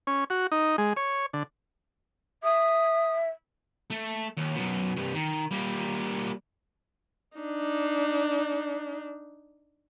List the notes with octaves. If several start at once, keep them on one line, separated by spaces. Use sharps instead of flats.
C#4
F#4
D#4
G#3
C#5
D3
E5 D#6
A3
D#2
F#2 B2
C2 G2
D#3
G3 A#3
D4 D#4